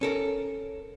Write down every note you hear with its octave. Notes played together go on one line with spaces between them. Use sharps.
C#4 A4 A#4